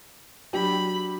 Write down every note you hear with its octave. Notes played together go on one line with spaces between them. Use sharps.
F#3 D4 G4 B5